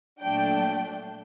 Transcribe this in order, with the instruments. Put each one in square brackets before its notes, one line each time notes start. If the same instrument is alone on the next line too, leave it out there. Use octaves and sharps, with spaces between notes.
[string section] A#2 F#3 A3 D4 G5